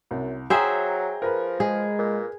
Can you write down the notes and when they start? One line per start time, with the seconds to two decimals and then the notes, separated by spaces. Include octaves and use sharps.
0.11 C2 F#2
0.50 F#3 G#4 C5 E5 G5 A#5
1.22 F3 A#4 B4
1.60 G#3 G#4
1.98 A#2